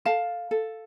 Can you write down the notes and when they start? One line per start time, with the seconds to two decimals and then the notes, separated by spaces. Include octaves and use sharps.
0.05 A4 F5 A5
0.51 A4